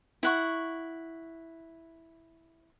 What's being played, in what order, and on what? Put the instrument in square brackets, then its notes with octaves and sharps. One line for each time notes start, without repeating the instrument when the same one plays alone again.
[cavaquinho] E4 F#5 C#6